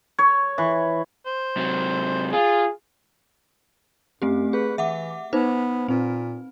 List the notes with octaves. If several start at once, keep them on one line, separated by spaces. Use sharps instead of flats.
C#5
E3
C5
C3 F#3
F4 G#4
F#2 A3 C4 G4
G#4 B4
E3 E5 F#5 D6
B3 D#4 B4 C5
A#2 C4